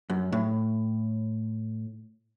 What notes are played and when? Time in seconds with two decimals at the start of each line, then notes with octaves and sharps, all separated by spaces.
0.10 F#2
0.32 A2